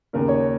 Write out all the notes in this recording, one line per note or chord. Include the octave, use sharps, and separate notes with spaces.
D#2 C#3 A#4
C#5